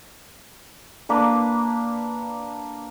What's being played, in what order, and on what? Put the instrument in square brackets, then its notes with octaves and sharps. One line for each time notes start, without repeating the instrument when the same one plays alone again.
[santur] A#3 D4 B4